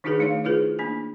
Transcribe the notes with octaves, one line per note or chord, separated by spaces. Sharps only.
D#3 D4 D#4 F#4 G#4 B4
A3 D#4 C#5 F5
E4 F4 G#4 B4 C5
A#3 D4 G#5